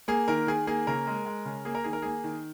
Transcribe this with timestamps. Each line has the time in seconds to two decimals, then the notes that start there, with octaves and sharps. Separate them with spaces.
0.08 A#3 G#4
0.28 D#3 A#4
0.47 D#3 G#4
0.67 A#3 G#4
0.87 C#3 A#4
1.07 G#3
1.26 G#3
1.45 C#3
1.65 A#3 G#4
1.75 A#4
1.84 D#3 G#4
1.93 A#4
2.02 A#3 G#4
2.24 D#3